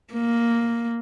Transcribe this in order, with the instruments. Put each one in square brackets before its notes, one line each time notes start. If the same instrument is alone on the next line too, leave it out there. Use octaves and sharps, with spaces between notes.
[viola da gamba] A#3